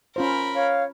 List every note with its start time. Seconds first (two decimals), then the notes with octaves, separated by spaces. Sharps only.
0.16 C#4 F4 A#4 C5 B5
0.55 C#5 F5